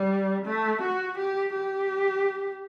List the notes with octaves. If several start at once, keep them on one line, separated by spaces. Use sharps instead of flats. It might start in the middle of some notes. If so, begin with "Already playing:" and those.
Already playing: G3
A3
F#4
G4
G4